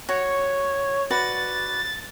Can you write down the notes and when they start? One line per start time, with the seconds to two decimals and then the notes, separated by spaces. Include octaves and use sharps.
0.09 F#4 C#5
1.11 F#4 B4 D5 A6